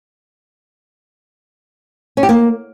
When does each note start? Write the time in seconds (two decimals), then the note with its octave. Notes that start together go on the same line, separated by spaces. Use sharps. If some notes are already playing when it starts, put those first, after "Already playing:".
2.17 C#4
2.23 G4
2.29 A#3